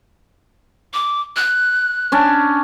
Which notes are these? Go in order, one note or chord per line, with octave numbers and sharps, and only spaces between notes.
D6
F#6
C#4 D4